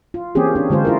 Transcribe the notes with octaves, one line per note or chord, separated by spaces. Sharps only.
F4
E3 A#3 C4 C#4 G4 G#4
C#4 D4
D3 G#3 F4 C5
E4 F4 A#4